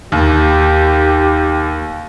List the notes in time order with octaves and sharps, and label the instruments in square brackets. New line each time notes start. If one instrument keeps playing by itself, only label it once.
[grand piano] D#2 [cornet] G4